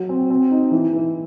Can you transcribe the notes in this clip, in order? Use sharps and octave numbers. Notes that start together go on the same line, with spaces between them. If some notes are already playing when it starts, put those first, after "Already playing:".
Already playing: F#3 F#4
C4
C4
D#4
E3
E3